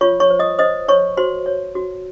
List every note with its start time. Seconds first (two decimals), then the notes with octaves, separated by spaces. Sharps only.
0.01 F4 C#5 C#6
0.20 C#5 C#6
0.30 C5
0.39 D#5 D#6
0.59 C5 D#5 D#6
0.88 C5 C#5 C#6
1.17 F#4 C5 C6
1.46 C#5
1.75 F#4